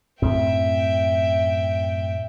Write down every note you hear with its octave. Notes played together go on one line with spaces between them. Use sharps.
F#2 A2 C4 E5 G5